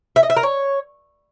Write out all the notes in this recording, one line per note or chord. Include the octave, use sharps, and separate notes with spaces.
E5
D#5
E5
A#4
C#5